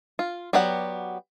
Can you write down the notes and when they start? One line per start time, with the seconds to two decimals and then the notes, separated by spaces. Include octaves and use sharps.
0.19 F4
0.53 F#3 B3 G4 D5 F#5